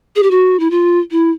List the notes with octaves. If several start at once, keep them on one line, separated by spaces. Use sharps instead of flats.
G#4
G4
F#4
E4
F4
E4